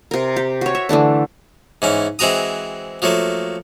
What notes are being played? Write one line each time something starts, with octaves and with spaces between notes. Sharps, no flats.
C3 A#4
G4
F#4 C#5
E5
D3 E3 A3 D4
G#2 E3 C#4
E3 G#3 C4 F#4 A#5 D#6
F3 F#3 A3 A#3